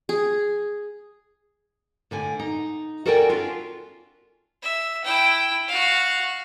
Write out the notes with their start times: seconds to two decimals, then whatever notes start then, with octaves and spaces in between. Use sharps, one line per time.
0.09 G#4
2.11 A2 D3 G#5
2.39 D#4
3.06 F#4 A4 A#4 D5 G5 G#5
3.30 C#4 D4 F4
4.62 E5
5.04 E4 G5
5.68 F#4 F5